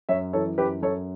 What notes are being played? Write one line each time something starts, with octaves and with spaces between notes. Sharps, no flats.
F#2 C#5 E5
E3 A4 C#5
F#2 G4 B4
F#2 A4 C#5